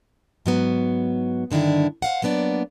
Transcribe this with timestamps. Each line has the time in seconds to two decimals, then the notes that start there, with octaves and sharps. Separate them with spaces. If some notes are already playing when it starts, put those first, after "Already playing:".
0.46 G#2 F#3 B3
1.51 G2 D3 D#3 D4 E4
2.02 C5 F5 F#5
2.22 F#3 A#3 B3 D4 D5